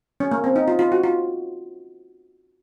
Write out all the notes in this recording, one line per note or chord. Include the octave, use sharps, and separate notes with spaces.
C#4
A#3
C4
D#4
F4
F4
F#4
F4